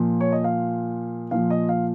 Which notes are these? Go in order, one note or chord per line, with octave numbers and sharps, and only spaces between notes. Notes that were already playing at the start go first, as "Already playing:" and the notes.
Already playing: A#2 F3
C#5
D#5
F5
A#2 F3 F5
D#5
F5